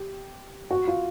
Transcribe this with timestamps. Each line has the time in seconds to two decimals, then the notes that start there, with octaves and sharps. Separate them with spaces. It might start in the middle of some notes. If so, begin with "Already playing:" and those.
Already playing: G4
0.71 F#4
0.88 F4